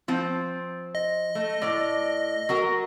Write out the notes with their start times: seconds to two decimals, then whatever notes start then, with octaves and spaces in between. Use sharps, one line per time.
0.08 F3 C4 F4
0.95 D#5
1.35 A3
1.62 A2 D5
2.49 F#3 F#4 A#4